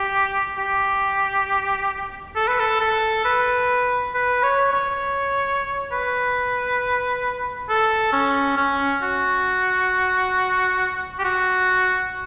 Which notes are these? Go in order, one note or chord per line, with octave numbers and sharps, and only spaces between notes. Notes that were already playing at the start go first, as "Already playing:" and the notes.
Already playing: G4
G4
A4
B4
A4
A4
B4
B4
C#5
C#5
B4
A4
C#4
C#4
F#4
G4
F#4